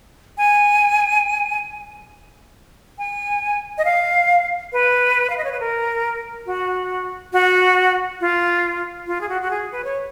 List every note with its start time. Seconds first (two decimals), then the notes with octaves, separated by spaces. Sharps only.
0.38 G#5
2.98 G#5
3.78 D#5
3.85 F5
4.73 B4
5.30 F5
5.38 D#5
5.44 C#5
5.52 B4
5.60 A#4
6.46 F#4
7.33 F#4
8.21 F4
9.07 F4
9.21 G#4
9.29 F#4
9.42 F#4
9.51 G#4
9.72 B4
9.84 C#5